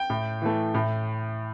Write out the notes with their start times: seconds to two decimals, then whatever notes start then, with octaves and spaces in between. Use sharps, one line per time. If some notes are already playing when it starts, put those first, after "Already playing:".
Already playing: G5
0.10 A2
0.42 E3 A3
0.74 A2